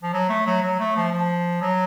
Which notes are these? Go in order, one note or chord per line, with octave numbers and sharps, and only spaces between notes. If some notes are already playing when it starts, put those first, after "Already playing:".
F3
F#3
A3
F#3
F#3
A3
F3
F3
F#3